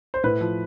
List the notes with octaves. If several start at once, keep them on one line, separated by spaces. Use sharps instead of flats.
C5
A2 B4
F3